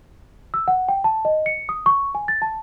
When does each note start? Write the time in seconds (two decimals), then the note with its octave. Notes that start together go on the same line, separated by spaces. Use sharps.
0.54 E6
0.68 F#5
0.89 G5
1.04 A5
1.25 D#5
1.46 C#7
1.69 D#6
1.86 C#6
2.15 G#5
2.28 A6
2.42 A5